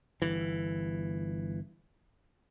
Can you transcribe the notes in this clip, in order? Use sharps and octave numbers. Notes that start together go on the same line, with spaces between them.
G1 E3